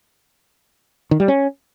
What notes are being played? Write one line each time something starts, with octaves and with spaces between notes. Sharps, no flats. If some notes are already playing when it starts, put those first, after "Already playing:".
D#3
G3
C#4